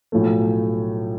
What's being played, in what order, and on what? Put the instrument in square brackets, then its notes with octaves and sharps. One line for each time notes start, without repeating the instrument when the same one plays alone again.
[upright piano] B1 A2 F3 A3